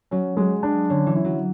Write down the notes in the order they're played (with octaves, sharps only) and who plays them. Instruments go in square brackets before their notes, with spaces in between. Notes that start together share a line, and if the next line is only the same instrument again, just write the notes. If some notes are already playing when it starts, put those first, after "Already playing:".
[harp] F#3 [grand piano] C#4
[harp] F#3 [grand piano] G#3
[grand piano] D4
[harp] D3 [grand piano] C#4
[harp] E3
[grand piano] E4
[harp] F#3